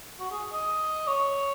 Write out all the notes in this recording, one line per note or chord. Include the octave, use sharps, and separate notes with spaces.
F#4
G#4
D#5
C#5